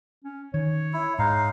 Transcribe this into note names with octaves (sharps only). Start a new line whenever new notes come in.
C#4
D#3 C#5
E4
G#2 G#3 D#4 F5